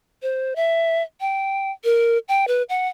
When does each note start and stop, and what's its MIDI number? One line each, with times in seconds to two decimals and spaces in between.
0.22 0.54 72
0.56 1.02 76
1.21 1.72 79
1.84 2.18 70
2.28 2.45 79
2.48 2.63 71
2.69 2.88 78